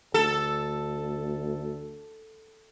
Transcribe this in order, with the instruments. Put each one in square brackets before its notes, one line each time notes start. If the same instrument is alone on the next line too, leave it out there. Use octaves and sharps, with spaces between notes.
[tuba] D2 [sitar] A4